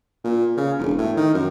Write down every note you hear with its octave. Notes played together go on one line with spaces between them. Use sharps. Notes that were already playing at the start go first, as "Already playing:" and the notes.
A#2
C#3
E1
A2
D#3
F#2